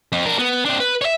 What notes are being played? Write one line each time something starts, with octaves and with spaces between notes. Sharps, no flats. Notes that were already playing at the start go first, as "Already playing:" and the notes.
F2
D4 A#4
B3
C4 D4
B4
C#5 E5